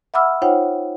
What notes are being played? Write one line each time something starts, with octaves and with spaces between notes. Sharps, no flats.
E5 F#5 B5 D6 E6 F6
D#4 F4 C5 C#5 F#5 G5